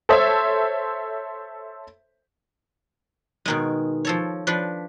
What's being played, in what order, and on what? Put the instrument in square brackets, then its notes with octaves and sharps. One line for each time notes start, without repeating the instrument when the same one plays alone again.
[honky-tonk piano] A4 C5 C#5 E5
[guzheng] B2 D#3 G#3
F3 A4 C#5
F3 D4 B4